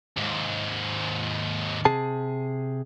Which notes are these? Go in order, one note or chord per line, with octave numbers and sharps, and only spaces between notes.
D#2 G#2
C3 G#4 A5